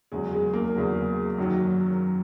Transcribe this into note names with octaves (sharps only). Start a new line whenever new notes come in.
E2 C#3 F#3 G#3
G#3
A#3
E2 C#3 F#3
F#2 D#3 F#3